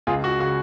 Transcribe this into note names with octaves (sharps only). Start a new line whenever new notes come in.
C#2 F4 G#4
F#4
C#3 F#4